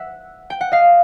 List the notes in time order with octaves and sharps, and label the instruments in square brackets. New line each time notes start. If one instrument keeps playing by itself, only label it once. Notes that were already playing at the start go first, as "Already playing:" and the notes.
Already playing: [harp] E5 F#5
G5
F#5
D#5 F5